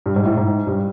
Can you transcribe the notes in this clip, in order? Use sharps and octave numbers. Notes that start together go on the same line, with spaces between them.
G2
G#2
A2
G#2
G2